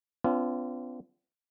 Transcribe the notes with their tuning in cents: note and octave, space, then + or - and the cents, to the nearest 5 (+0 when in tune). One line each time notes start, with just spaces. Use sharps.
B3 +45 D4 -45 F4 -25